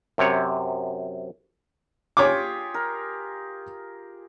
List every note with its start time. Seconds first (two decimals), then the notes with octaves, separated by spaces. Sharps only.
0.18 F#2 C3 C#5
2.17 F4 G4 G#4 C#5 D6
2.74 A#4